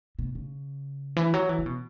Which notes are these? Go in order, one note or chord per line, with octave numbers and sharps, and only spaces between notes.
B2
C#3
E3
F#3
E3
C#3
B2